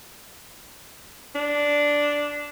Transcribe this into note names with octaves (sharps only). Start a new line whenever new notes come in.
D4